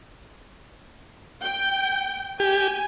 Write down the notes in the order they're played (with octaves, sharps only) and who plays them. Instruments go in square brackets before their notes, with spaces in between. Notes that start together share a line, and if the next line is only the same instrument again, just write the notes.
[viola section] G5
[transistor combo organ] G4 [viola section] G#5